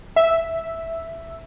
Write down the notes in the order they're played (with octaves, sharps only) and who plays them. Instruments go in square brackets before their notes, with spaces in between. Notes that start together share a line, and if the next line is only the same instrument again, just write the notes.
[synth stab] E5